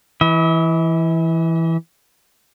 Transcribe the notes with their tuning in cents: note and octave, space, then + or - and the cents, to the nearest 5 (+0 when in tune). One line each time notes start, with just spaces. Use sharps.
E3 +0 E5 -45